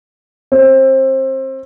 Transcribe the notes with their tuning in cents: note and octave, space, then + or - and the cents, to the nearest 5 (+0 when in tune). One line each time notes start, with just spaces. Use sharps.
C4 +25